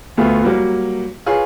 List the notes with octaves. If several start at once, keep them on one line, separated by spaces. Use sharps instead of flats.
D2 A3 B3 F4
F#3 G3 A#3
F4 G#4 B4 C#5